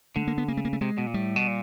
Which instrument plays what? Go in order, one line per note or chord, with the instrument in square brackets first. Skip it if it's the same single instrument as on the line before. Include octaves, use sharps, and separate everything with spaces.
[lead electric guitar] D3 [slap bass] A3
[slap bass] A#3
B3
[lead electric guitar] C#3 [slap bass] A#3
[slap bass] A3
A#3
A3
[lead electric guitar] C3 [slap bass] G#3
[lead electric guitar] B2
A#2
[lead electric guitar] A2 [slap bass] G3
[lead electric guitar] B2
A#2